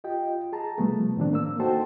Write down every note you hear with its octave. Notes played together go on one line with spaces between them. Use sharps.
F4 G4 D#5 G5
G#4 A5 A#5
C3 F3 G3 A3 B3
A2 D#3 C4 D4
A#3 E6
D#4 F#4 A4 C5 G5 A5